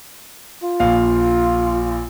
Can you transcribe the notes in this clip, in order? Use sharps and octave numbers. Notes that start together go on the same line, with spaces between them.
F4
A#1 F5